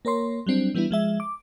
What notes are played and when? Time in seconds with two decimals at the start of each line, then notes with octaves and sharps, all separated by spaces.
0.05 A#3 A#4 C#5 C6
0.46 F#3 G3 C4 D4
0.74 E3 G3 B3 D4 E4
0.91 F3 G#3 E5
1.20 D6